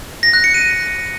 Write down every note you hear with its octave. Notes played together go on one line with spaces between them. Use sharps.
A#6
F#6
C#7
D#7